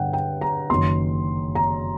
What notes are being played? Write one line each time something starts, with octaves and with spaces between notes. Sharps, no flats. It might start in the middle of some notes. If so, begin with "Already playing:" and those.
Already playing: G2 D3 F#5 G5
G5
A#5
F#1 F#2 D#3 C6
A#5